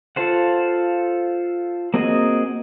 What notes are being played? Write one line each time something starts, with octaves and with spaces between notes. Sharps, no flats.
F4 A4 C5 F#5
A#3 C4 F#4 G#4 D#5